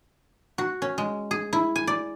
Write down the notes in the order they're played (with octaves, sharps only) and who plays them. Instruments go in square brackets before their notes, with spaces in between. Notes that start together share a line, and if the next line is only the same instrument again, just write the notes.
[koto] F#4
C#4
G#3
G#4
E4
G#5
D5